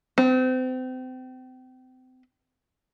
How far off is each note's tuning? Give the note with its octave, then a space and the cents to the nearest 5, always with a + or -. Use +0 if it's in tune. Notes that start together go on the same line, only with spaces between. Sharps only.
C4 -35